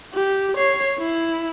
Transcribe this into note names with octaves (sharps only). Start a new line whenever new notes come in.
G4
C#5 C7
E4